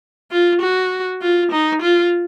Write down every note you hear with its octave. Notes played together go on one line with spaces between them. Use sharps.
F4
F#4
F4
D#4
F4